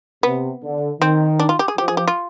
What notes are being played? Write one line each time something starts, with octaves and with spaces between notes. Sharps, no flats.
C3 B3
D3
D#3 C4
D4
F4
G4
G#4
F3 G4
G#4
G4
F4